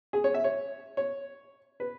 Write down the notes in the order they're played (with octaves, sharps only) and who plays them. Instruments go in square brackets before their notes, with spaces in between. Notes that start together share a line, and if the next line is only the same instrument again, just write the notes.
[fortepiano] G#4
C#5
E5
C#5
C#5
B4